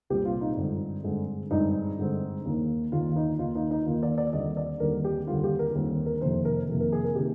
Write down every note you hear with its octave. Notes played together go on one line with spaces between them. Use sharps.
C2 A#2 G3 C4 G4
F4
D#4
G2 D3 G#3 C4
G2 D3 G#3 C4
G2 D3 G#3 C4 D#4
G2 D3 G#3 C4
D#2 D#3 A#3
D#2 D#3 A#3 F4
D#4
D#2 D#3 A#3 F4
D#4
D#4
D#2 D#3 A#3 F4
D5
D5
D#2 D3 G3 C4 D#5
D5
D#2 D3 G3 C4 A#4
G4
D#2 D3 G3 C4 F4
G4
A#4
D#2 D3 G3 C4
A#4
F2 C3 D#3 A#3 C5
A#4
F2 C3 D#3 A#3
A#4
G#4
A#4
C3 D#3 A#3 G4